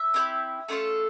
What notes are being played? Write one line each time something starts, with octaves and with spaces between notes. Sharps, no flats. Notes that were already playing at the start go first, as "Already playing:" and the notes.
Already playing: E5
C4 E4 G4
A3 C#4 F4 A4